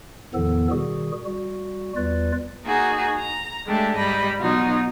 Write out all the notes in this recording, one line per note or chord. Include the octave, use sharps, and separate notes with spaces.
E2 A2 D#3 F3 B3 A4
B2 D#3 G3 F#4 G#4
G3 F#4
E2 G3 F4 B4 D5
A#3 D#4 F#4 G#4
A#5
G#3 A3 D4 G4
G#2 G3 D#5 B5
B2 F#3 D#4 F4 F#4